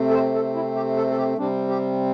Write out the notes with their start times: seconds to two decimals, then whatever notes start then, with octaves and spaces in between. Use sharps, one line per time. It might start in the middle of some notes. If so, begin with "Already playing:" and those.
Already playing: C3 A3 C4
0.09 A4
0.13 C5
0.35 A4
0.55 E4
0.75 G4
0.97 A4
1.10 A4
1.17 G4
1.38 C3 G3 C4 D4
1.68 G4